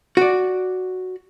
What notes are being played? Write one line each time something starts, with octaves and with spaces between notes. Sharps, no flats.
F#4 D5